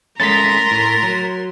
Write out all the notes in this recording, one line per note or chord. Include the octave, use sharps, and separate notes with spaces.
G#3 A3 C#4 A#4 A#5 C6 A6 B6
A2
F#3